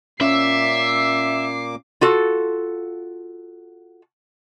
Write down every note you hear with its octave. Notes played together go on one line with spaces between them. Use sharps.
A#2 A#3 C#4 E5 D6 C7
F4 F#4 A4